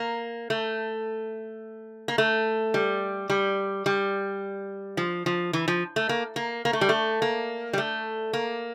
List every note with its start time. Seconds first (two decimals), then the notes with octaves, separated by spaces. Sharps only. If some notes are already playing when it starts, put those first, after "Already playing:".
Already playing: A#3
0.50 A3
2.08 A#3
2.18 A3
2.74 G3
3.30 G3
3.86 G3
4.97 F3
5.26 F3
5.53 E3
5.68 F3
5.96 A3
6.09 A#3
6.36 A#3
6.65 A#3
6.73 A3
6.81 G3
6.89 A3
7.22 A#3
7.73 G3
7.78 A3
8.33 A#3